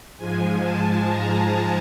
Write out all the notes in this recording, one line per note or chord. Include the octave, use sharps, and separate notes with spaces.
G#2 F3 G#3 G#5
A5
A#5
A5